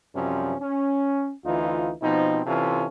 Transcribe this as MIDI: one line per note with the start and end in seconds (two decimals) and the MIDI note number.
0.14 0.54 42
0.14 0.54 48
0.14 0.54 53
0.14 0.54 55
0.14 0.54 61
0.59 1.31 61
1.45 1.91 38
1.45 1.91 52
1.45 1.91 63
1.45 1.91 65
2.02 2.41 47
2.02 2.41 53
2.02 2.41 60
2.02 2.41 63
2.46 2.86 48
2.46 2.86 52
2.46 2.86 61
2.46 2.86 65
2.46 2.86 69